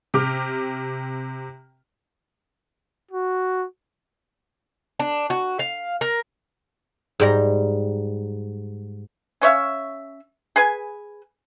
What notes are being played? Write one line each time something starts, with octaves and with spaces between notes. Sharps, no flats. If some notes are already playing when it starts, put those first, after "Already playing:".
C3 G4 D6 F6
F#4
D4
F#4
F5
A#4
G#2 G3 A#5
C#4 C#5 E5 F5
G#4 B4 G#5